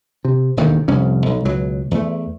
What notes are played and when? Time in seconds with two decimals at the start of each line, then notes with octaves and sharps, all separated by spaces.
0.25 C3
0.57 E1 D#2 D3 D#3
0.88 F1 C2 F3 C#4
1.26 B1
1.45 C#2 B2 F#3
1.91 E2 A3